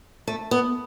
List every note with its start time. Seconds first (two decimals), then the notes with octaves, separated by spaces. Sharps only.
0.27 A3
0.51 B3